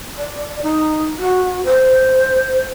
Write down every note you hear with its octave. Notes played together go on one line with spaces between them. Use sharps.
D5
D#4
F#4
C5